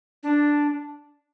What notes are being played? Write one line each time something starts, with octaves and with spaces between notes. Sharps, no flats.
D4